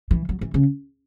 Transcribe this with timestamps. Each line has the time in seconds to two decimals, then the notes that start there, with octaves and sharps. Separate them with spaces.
0.11 E3
0.29 F#3
0.41 E3
0.54 C#3